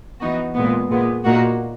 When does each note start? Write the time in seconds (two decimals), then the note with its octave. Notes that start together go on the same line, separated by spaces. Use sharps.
0.20 E3 B3 D#4 F#4
0.55 A#2 G#3 B3
0.89 A#2 G#3 B3
1.24 A#2 A#3 D#4 F#4